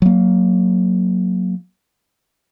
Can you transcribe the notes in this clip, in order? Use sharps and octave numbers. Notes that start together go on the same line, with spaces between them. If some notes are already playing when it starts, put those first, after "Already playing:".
F#3 A#3